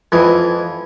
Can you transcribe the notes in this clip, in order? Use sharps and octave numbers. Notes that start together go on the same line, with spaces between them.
F2 E3 D#6